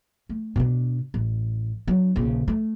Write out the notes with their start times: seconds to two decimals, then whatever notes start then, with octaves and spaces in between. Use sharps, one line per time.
0.29 A3
0.56 B2 D4
1.14 A1
1.88 F#3 D4
2.16 A#1 C#3
2.48 A3